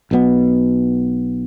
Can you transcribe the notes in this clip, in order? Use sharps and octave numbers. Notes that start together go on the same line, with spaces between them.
B1 B2 B3